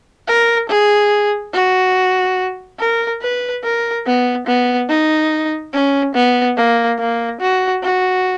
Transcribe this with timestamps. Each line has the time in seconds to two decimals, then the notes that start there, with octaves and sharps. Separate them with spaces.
0.28 A#4
0.69 G#4
1.54 F#4
2.79 A#4
3.22 B4
3.64 A#4
4.06 B3
4.47 B3
4.89 D#4
5.73 C#4
6.15 B3
6.57 A#3
7.00 A#3
7.41 F#4
7.83 F#4